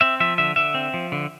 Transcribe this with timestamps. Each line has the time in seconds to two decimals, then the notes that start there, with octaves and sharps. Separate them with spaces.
0.01 C4 E5
0.20 F3 E5
0.38 D3 E5
0.56 D3 E5
0.74 C4
0.94 F3
1.12 D3